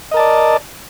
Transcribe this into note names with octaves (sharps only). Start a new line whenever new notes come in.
A#4 D5 D#5 A5